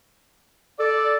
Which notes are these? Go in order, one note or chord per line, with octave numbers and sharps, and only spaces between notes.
A4 D5